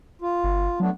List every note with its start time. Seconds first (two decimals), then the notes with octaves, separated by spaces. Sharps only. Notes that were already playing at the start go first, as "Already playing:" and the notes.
0.22 F4
0.44 G1
0.80 F#3 A3 B3 D4